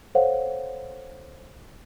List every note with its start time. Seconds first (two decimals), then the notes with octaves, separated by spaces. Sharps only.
0.15 A4 C5 C#5 F5 F#5